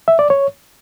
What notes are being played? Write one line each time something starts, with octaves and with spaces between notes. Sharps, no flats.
E5
D5
C#5